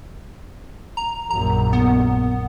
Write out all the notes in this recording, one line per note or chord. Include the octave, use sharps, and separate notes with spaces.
A#5
A#1 F#2 A#5
B3